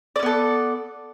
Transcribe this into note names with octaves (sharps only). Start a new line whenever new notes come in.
B3 C#4 A4 D5